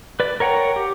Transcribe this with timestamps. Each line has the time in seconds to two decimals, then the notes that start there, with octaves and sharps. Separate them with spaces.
0.20 B4 D5
0.40 A#4 C#5 F#5 G5 A#5
0.76 G4